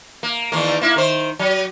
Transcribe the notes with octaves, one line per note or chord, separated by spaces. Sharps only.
A#3
E2 D#3 A#3
A#3 E4
D#3 C5
F#3